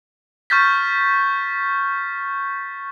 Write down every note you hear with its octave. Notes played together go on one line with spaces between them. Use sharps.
C#6 F6 G6 A6 B6